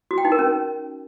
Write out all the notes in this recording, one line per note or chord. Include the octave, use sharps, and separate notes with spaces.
F#4
G5
D#4
A#4
C#4